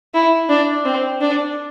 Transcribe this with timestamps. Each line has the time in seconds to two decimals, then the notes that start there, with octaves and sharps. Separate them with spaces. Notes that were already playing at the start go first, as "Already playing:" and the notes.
0.14 E4
0.49 D4
0.85 C4
1.21 D4